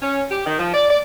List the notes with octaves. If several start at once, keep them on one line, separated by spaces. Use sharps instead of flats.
C#4
G4
D#3
F3
D5
D5